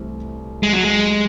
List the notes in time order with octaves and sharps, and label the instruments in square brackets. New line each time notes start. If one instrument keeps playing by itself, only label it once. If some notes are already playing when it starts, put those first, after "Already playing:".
Already playing: [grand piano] C2 C3 E3 A3
[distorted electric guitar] G#3
F#3
G#3